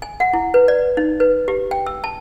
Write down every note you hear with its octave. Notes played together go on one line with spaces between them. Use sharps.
G#5
F#5
E4
B4
D5
D#4
B4
G4
G5
E6
A5